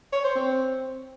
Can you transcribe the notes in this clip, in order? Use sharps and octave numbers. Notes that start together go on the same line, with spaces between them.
C#5
C5
C4